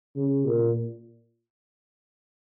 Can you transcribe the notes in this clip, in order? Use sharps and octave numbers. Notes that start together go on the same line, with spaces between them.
C#3
A#2